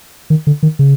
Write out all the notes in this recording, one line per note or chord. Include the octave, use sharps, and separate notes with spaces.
D#3
D3
D#3
C#3